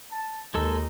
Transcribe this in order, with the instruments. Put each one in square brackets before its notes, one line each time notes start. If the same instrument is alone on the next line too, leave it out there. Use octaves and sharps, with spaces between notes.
[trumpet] A5
[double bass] D#2 [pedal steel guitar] G#3 A4 E6 [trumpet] D#4